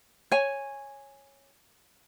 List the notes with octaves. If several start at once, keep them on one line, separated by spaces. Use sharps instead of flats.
C#5 G#5